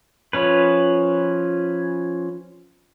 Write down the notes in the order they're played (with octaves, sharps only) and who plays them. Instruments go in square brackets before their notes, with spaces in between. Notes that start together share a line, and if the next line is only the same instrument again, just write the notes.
[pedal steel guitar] F3 C#4 B4